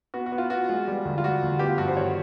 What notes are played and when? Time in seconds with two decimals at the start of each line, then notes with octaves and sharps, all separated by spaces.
0.14 B3 F#4
0.26 F#4
0.32 B3
0.38 F4
0.50 B3 F#4
0.69 G#3 F4
0.88 G3
1.05 D2
1.18 F4
1.24 G3 F#4
1.42 D2
1.59 B3 G4
1.70 F4
1.78 G2 F#4
1.88 C5
1.97 D#3 C#5